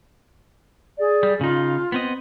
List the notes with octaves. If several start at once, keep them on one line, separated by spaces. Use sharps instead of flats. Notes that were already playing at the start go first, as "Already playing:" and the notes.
G#4 D5
G3
C#3 D#4 F4
B3 C4 D#5